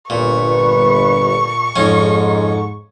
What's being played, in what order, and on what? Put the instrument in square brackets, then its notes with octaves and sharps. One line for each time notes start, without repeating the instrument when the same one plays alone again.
[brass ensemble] G1 B4 [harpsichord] A#2 [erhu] C#6
[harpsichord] F2 C#4 [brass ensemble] G#2